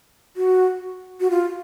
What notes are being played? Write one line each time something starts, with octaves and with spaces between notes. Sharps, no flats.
F#4
F#4
F4